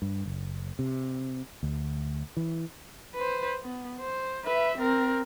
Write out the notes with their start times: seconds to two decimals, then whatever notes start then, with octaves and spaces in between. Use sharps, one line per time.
0.02 G2
0.26 F#1
0.79 C3
1.63 D2
2.37 E3
3.15 B4 C5
3.63 B3
4.00 C5
4.45 B4 E5
4.78 C4 A#4